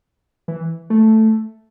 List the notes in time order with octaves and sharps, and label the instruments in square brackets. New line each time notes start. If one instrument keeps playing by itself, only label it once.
[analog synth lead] E3
A3